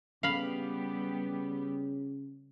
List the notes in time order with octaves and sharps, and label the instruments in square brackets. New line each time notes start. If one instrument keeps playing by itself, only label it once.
[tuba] C#3 [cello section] G3 B3 G4 [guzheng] F5 B5